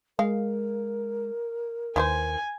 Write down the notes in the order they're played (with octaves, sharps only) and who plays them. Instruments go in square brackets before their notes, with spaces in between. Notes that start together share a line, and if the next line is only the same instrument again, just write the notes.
[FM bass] G#3 [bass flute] A#4 [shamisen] F5
[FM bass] D#2 [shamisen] E3 E4 C5 [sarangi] G#5